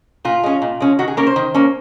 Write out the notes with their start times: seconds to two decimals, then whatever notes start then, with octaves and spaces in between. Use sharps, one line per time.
0.25 A#2 F4
0.43 G#3 C#4
0.62 A#2
0.80 G#3 C#4
0.99 D#3 F#4
1.08 G#4
1.17 A#3 C#4 A#4
1.27 C5
1.36 D#3
1.54 A#3 C#4